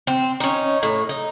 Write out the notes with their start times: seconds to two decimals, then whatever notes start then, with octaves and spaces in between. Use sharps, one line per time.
0.07 C4
0.40 C#4 D#4
0.83 A2
1.09 D#4